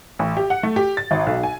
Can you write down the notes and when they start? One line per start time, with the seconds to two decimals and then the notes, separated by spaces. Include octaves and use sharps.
0.19 A1
0.37 G4
0.50 F#5
0.63 A3
0.76 G4
0.97 A6
1.11 G#1
1.27 B1
1.43 G#5